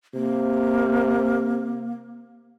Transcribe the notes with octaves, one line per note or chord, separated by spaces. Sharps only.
C3 A#3